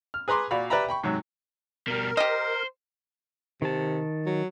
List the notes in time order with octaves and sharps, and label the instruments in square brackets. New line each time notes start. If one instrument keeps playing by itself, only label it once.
[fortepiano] F6
G#4 B4 A#5 C6 D6
A#2 F#4 D5 F5 B5
G4 B4 D5 E5 A#5 B5
G5 B5 C#6
G#2 C3 F#3
[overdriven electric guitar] B2 G3 [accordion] A#4
[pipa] G4 D#5 [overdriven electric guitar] C5
[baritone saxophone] C3 [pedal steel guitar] D#3 A5
[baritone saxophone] F#3